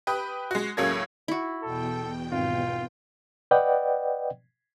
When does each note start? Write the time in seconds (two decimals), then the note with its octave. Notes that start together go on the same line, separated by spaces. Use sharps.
0.07 G4 B4 D#6
0.51 G#3 F#4
0.77 C#2 A2 F#3 A#3 G#4 G#6
1.28 E4 F#4
1.63 E2 B2 A4 G5
2.32 G#1 F4
3.51 B4 D5 D#5 F#5 G5